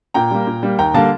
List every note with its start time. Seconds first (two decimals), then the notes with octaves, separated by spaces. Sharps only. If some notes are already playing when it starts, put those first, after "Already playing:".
0.14 A#2 G5 A#5
0.31 G3 A#3
0.47 A#2
0.63 G3 A#3
0.79 D#2 G5 A#5
0.94 D3 G3 A#3 F5 A5